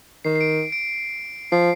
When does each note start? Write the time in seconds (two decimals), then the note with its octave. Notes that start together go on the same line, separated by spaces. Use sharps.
0.25 D#3 C7
0.36 C7
0.41 D7
0.72 D7
1.52 F3 C7